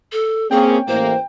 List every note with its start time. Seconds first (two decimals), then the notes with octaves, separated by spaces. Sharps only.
0.12 A4
0.51 A#3 C4 C#4 G#4 G5
0.88 A1 A#3 C5